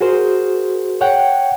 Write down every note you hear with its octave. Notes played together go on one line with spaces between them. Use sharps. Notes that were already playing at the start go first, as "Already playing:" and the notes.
F#4 G#4 A#4 C5
C#5 F#5 G5